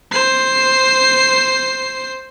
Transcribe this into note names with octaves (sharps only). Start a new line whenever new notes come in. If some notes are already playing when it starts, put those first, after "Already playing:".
C5 C7